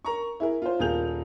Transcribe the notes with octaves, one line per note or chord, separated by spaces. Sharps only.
A#4 A#5 C#6
E4 G#4 A#4
F4 C5
D#1 F4 G#4 A#4 G6 F7